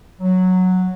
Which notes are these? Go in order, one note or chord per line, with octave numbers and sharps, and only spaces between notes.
F#3